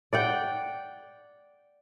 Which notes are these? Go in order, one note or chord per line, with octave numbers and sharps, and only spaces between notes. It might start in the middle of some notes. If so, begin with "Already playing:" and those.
D5 F#5 G5